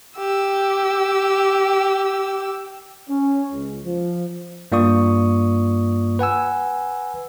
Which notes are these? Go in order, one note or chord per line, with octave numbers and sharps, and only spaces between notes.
G4 E6
C#4
C#2
F3
G2 A#3 F4 D5 C#6 D#6
B4 F#5 G#5 E6